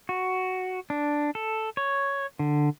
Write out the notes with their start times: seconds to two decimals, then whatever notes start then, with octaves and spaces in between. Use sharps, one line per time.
0.09 F#4
0.90 D4
1.35 A4
1.77 C#5
2.39 D3